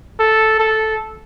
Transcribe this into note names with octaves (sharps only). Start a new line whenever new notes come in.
A4
A4